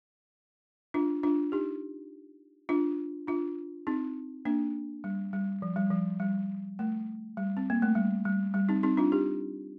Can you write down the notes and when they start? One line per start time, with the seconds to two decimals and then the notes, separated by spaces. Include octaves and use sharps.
0.94 D4 F4
1.23 D4 F4
1.52 D#4 G4
2.69 D4 F4
3.27 D4 F4
3.87 C4 D#4
4.45 A#3 D4
5.04 G3
5.33 G3
5.62 F3
5.76 G3
5.91 F3
6.20 G3
6.79 A3
7.37 G3
7.57 C4
7.70 A#3
7.82 A3
7.95 G3
8.25 G3
8.54 G3
8.69 C4 D#4
8.83 C4 D#4
8.97 D4 F4
9.12 D#4 G4